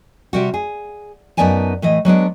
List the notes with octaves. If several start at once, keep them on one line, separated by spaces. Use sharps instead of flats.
C3 G3 F#4
G#4
F#2 B3 D#4 D5 G#5 A5
A2 E3 D#5
F#3 G#3 B3 D4